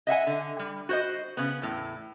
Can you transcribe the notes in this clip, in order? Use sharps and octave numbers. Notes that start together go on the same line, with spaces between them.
D#5 E5 F#5 G#5
D3
G3
F#4 C5 D#5
C#3 B3
E2 A2